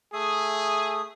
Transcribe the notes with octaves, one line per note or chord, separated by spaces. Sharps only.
A3 G#4 E5 D#6